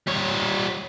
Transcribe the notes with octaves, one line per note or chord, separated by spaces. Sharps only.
G3 C#5